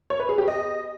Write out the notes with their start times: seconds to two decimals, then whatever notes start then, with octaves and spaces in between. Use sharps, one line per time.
0.10 C#5
0.20 B4
0.29 G#4
0.38 G4
0.48 D#5